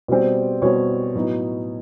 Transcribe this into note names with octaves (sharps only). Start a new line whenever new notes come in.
B2 G3 C4
B2 G3 C4 C#5
A2 F#3 B3 D#4